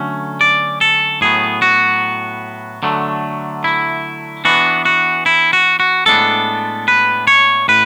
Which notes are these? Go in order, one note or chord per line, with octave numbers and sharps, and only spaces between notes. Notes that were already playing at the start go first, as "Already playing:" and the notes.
Already playing: D3 F#3 A3 C#4
D5
A4
A2 F#3 B3 G#4
F#4
D3 F#3 A3
E4
E3 B3 D4 F#4
F#4
E4
F#4
F#4
A2 G#3 B3 D4 A4
B4
C#5
A2 B4